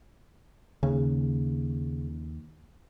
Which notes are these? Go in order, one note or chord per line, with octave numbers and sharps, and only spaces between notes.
D#2 C#3